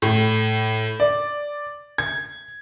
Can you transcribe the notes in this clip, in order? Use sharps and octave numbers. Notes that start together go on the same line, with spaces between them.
A2
D5
G#6